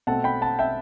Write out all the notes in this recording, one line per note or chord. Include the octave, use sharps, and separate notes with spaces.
B2 A3 C4 F#5 A5
G5 B5
F#5 A5
E5 G5